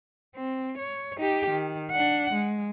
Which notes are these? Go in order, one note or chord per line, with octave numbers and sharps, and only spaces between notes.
C4
C#5
D#4 G4
D#3
D4 F#5
G#3